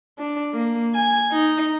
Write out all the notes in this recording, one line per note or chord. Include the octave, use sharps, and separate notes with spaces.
D4
A#3
G#5
D#4